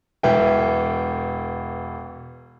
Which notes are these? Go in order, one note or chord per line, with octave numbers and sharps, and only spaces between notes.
E1 E3 E5 G5